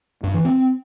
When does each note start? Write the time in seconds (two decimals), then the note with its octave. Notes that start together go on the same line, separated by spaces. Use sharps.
0.23 G2
0.34 E3
0.45 C4